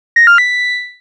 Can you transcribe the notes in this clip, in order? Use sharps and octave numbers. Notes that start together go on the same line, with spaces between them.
A#6
F6
B6